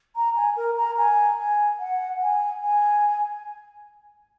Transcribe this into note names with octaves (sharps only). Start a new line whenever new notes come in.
A#5
G#5
A#4
A#5
G#5
G#5
F#5
G#5
G#5